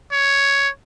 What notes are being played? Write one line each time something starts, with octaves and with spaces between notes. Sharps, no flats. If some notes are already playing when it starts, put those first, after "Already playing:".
C#5